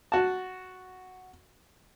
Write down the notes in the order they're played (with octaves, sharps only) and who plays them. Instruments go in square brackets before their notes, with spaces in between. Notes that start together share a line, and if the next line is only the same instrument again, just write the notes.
[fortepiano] F#4 A5